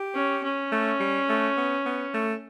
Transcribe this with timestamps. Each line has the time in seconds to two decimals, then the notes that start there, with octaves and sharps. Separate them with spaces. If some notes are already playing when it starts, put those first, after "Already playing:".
Already playing: G4
0.14 C#4
0.44 C#4
0.72 A3
1.00 G3
1.29 A3
1.57 B3
1.86 B3
2.14 A3